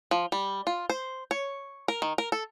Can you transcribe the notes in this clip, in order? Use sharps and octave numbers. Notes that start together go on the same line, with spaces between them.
F3
G3
F4
C5
C#5
A#4
D#3
A#4
A4